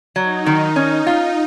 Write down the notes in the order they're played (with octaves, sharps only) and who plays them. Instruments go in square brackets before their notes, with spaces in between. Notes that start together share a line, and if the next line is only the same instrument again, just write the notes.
[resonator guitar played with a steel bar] F#3 [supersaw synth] D#4
[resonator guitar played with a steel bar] D#3
C#4
F4